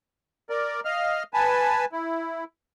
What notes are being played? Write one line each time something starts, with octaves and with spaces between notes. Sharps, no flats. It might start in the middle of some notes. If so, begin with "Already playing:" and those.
A#4 D5
D#5 F5 F6
B4 G#5 A5
E4